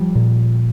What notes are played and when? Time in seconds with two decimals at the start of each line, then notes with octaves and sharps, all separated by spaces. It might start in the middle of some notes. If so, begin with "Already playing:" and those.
Already playing: F3 G3
0.15 A#2